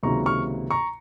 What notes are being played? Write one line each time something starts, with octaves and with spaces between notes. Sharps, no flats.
C#2 C3 D#3 F#3 A#3 A#5 C#6
C#6 F6
A#5 C#6